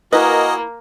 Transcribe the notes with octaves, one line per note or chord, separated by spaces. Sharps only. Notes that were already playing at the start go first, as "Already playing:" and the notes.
A#3 E4 F#4 A#4 B4 D#5 G#5